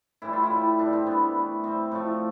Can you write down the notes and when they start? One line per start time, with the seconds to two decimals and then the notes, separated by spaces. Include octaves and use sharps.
0.22 A2 E3 G3 E4
0.33 F4
0.43 E4
0.50 A2 G3
0.79 G2 D3 G3 D4
0.93 C4
1.07 A2 E3 G3 B3
1.35 C3 E3 A3
1.63 C3 G3 C4
1.92 A2 F3 A3